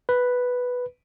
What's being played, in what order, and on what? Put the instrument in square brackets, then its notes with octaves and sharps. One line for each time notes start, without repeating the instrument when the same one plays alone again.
[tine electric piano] B4